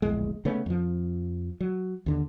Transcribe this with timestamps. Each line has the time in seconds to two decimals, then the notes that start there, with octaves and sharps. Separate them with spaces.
0.02 D1 A#1 E2 G#3
0.45 C#3 A3 B3 C#4
0.66 F2 F3
1.60 F#3
2.06 D#2 D3